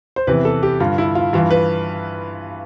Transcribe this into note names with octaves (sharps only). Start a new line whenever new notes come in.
C5
E2 C3 E3 B4
A4
G4
G2 D3 F4
E4
F4
G2 E3 F4
B4